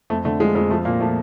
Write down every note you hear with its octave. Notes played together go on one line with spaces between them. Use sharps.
F2 A3
D3 A3
F3 G#3
F2 G#3
F3 A3
A#2 A#3
F3 A3